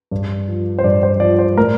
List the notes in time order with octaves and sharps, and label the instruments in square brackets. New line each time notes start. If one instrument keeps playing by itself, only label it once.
[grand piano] G2
F3
C5
G2 D5
C5
F3 D5
C5
A2 A#4